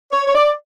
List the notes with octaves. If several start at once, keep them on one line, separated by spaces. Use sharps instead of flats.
C#5
C#5
D5